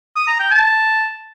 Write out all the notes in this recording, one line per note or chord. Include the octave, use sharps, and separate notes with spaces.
D#6
A#5
G5
A5